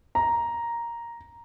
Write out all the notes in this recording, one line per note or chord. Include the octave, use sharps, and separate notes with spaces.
A#5